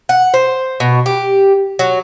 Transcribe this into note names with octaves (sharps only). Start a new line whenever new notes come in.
F#5
C5
B2
G4
F#3